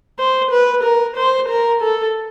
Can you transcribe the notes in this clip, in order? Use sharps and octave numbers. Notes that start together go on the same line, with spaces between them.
C5
B4
A#4
C5
A#4
A4